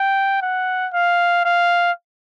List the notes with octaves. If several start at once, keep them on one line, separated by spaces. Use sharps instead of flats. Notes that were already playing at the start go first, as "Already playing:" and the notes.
Already playing: G5
F#5
F5
F5